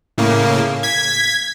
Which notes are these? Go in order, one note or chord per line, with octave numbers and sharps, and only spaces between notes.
A2 C#3 A#3
G#6 B6